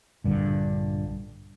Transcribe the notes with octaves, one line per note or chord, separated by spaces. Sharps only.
A#1 G2 D3